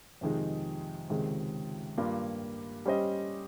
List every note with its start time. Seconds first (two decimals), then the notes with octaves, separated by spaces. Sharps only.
0.21 F2 C3 D#3 G#3 D#4
1.09 C#2 C3 D#3 G#3
1.98 G2 G3 A#3 F4
2.86 G3 C#4 G4 C5 D#5